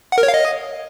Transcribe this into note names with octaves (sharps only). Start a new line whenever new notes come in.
F#5
A#4
C#5
F5
D#5